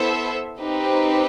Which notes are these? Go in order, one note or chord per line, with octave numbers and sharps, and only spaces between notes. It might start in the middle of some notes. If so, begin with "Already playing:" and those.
Already playing: B3 E4 A4 C5 E5
C4 D#4 G4 B4